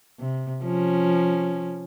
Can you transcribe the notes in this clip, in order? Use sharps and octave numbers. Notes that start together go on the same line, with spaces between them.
C3
F3 C#4